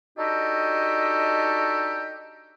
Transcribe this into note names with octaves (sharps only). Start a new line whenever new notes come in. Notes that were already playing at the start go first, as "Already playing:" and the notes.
D4 D#4 F#4 G4 A4 D#5